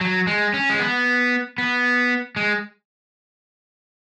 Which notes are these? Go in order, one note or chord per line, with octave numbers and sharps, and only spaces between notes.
F#3
G#3
C#4
G#3
B3
B3
G#3